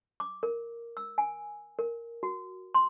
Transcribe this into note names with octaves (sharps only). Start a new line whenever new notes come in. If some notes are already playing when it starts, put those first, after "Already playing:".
D6
A#4
E6
G#5
A#4
F#4
C6